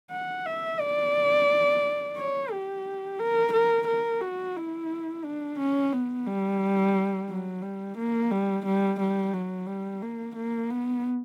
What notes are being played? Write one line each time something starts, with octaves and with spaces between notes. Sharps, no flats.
F#5
E5
D5
C#5
G4
A#4
A#4
A#4
F#4
E4
D4
C#4
B3
G3
F#3
G3
A#3
G3
G3
G3
F#3
G3
A#3
A#3
B3